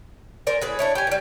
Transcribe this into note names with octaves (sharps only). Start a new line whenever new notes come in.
A#4 C5 D5 G#5
A2 G#4 B4
D4 E4 C#5
G4 G#5
E3 G3